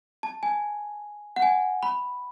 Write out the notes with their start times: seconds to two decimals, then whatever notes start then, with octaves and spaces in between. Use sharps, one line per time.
0.23 A5
0.43 G#5
1.36 F#5
1.42 G#5
1.83 B5